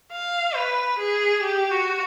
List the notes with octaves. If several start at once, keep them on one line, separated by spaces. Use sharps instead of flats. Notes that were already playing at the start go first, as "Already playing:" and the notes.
F5
B4
G#4
G4
F#4